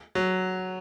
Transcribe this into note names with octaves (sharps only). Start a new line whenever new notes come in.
F#3